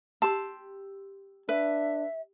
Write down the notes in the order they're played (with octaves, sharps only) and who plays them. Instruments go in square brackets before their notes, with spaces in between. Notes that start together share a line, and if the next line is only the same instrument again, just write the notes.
[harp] G4 C6 E6 [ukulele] A5
[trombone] D4 [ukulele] B4 [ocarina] E5